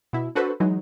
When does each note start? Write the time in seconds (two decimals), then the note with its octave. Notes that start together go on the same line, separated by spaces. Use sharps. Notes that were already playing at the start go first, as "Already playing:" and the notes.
0.13 B2 E4
0.35 D4 F#4 A4 B4 C5
0.60 E3 F#3 G#3 D#4